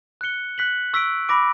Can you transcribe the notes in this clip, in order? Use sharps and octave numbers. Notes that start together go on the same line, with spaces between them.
F#6 C#7 G7
F#6 B6 F#7
C#6 E6 B6 D7
B5 D6 A#6 D7